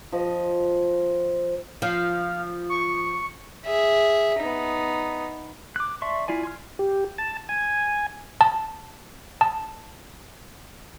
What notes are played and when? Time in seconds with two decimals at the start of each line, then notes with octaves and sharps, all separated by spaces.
0.12 F3 D#5
1.82 F3 F5
2.70 C#6
3.66 G#4 E5
4.39 B3 D#4
5.76 D6 F#6
6.02 D5 E5 A5 C6 C#6
6.28 E4 F4 D5 G#5
6.43 G#5 C6 F6
6.79 G4
7.18 A5
7.49 G#5
8.41 A5
9.41 A5